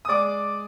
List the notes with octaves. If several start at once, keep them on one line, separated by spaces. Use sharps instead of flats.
D#6
G#3 D5 D6